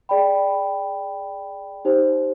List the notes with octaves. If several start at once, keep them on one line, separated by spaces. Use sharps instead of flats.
G#4 D5 G5 B5
D#4 G4 C5